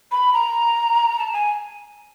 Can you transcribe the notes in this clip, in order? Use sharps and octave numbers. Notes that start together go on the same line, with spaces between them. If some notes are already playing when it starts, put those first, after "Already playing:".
B5
A#5
A5
G#5